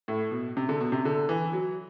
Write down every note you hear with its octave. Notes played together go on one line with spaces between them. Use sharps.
A2
B2
C3
D3
B2
C3
D3
E3
F#3